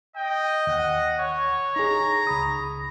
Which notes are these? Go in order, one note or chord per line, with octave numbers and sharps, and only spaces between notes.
D#5 G5
D#2 F#5
C#5
D#4 G#4 A#5
C#2 B5 D#6